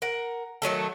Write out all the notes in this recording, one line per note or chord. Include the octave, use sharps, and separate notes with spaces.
A#4 F#5
D#3 F#3 A3 A4